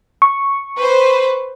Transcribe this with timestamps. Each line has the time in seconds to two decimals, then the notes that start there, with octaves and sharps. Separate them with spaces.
0.22 C#6
0.77 B4 C5